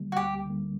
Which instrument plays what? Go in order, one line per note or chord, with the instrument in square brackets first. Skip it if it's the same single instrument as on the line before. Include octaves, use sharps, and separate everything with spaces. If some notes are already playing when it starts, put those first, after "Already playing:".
Already playing: [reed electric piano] D2 D3 G3 A#3
[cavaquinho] F#4
[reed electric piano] D2 [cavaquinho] G4
[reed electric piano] D3 G3 A#3